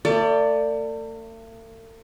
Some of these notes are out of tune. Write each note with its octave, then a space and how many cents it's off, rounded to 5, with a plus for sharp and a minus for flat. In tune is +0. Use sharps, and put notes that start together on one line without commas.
A3 +45 D5 +0